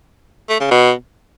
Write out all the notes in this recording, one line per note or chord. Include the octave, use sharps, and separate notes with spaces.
A3
C#3
B2